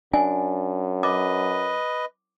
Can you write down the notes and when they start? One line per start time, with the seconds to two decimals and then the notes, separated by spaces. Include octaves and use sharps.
0.13 F#2 D4 G#5
1.03 B4 D#5 D6